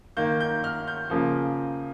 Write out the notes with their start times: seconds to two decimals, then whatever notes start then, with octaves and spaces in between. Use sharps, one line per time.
0.17 D#3 A#3 G6
0.40 G6
0.64 F6
0.87 G6
1.10 C#3 F3 A#3